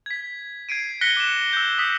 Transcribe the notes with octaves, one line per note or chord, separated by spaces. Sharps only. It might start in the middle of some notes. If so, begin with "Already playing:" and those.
G#6 B6
G#6 C7 D7 D#7
F#6 A#6 B6 C#7 D7 G7
D6 E7
E6 G6
D#6 B6